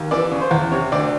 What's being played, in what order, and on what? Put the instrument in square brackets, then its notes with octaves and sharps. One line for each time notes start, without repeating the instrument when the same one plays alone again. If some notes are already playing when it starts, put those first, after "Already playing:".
Already playing: [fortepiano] D#2
E3 D5
C#3
C5
E2
C3 C#5
D2 D5